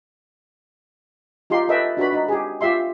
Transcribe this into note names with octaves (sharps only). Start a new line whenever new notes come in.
D#4 F4 G4 C6
A4 B4 D#5 E5 G5
D4 F#4 B4 B5
D#4
G4 G#4
F4 G4 E5 C6